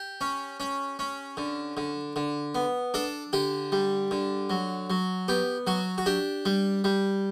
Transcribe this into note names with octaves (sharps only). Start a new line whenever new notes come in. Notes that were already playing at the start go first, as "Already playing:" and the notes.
Already playing: G4
C#4
C#4
C#4
D3
D3
D3
B3
D4 A4
D3 G4
G3
D3
F#3
F#3
B3 G4
F#3 F#4
F#4
D4 G4
G3
G3